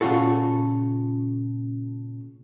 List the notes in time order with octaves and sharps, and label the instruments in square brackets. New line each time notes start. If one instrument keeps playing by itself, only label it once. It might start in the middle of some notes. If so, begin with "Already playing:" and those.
[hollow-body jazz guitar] A#2 C#3 G#3 F4 F#4 A4